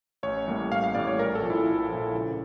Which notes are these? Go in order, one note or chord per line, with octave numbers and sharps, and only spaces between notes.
A1 C#5
A2 G3 A#3
A1 F5
F5
A2 G3 A#3 D5
C#5
A#1 A#4
A4
A#2 F3
E4
A#1
A#2 F3
C#2